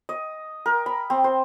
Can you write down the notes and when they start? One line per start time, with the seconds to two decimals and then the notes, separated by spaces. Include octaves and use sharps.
0.09 D#5
0.66 A#4
0.86 B5
1.10 C4
1.24 C5